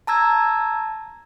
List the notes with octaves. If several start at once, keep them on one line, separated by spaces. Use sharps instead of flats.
A5 A#5 E6 G#6